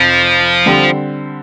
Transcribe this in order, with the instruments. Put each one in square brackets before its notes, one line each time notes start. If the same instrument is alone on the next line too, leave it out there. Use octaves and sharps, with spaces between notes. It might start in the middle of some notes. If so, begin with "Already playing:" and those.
Already playing: [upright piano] F1 F2 [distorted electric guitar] F3
[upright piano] D3 G3 C4 G4